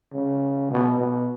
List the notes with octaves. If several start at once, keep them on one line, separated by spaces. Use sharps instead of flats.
C#3
B2
B2